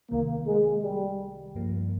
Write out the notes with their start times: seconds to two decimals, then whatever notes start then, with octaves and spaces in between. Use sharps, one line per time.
0.10 C2 C3 D#3 A#3
0.47 G#3
0.83 G3
1.55 G2 F3 A#3